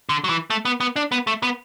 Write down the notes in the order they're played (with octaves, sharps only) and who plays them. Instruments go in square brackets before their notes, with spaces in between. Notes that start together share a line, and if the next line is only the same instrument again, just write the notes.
[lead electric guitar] D3
F#3
E3
A3
B3
B3
D4
B3
A3
B3